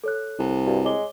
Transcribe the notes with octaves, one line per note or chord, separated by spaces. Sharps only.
A4 C#5 F#6
C2
G2 F#4
G#3 C#5 D6 G7